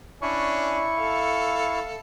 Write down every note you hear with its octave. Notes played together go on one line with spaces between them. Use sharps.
C#4 D4 E4 C#6
A4 F5